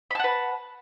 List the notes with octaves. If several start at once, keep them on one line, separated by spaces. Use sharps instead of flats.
B4 F#5 A5 B5